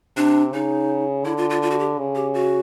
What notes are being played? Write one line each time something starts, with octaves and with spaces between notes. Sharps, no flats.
C3 D4
C#3 D#4
D3 E4
F4
F4
F4
F#4
G4
C#3
G4
F#4